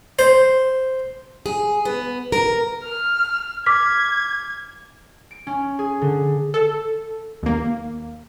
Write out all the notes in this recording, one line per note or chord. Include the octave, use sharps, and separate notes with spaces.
C5
G#4
B3
A#4
F6
D6 F6 G#6 B6
D7
C#4
G#4
D3
A4
D#2 A#3